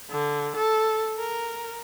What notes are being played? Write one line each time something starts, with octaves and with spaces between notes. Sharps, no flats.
D3
A4
A#4